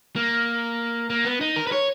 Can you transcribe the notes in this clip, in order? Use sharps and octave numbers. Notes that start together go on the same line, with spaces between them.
A#3
A#3
B3
D#4
A#4
B4
C#5